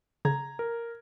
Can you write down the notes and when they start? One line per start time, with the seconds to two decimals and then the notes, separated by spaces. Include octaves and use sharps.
0.25 C#3 A#5 G#6
0.59 A#4